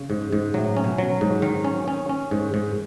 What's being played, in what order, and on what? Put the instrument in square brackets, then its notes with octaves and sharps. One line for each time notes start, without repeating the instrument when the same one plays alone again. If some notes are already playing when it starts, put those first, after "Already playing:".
Already playing: [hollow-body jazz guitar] C#3
[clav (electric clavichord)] G#2
G#2
[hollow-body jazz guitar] A2 [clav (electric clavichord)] F#3
[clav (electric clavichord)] C#4
[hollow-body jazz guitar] B2
[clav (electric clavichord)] F#3
G#2
[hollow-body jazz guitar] D#3 [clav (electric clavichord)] F#3
[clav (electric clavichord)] C#4
C#4
C#4
G#2
G#2